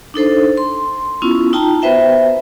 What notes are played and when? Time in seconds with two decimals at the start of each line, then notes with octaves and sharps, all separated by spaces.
0.14 D4 D#4 A4 C5
0.57 C6
1.22 B3 C#4 E4 F4
1.53 D#4 F4 G5 A5 A#5
1.82 B3 F#4 B4 C5 E5 G5